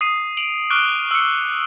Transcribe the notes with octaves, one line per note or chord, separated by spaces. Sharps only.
D#6 C7 D#7
D7 F7 F#7
C#6 D6 F6 F#6 D7 G7
E6 C#7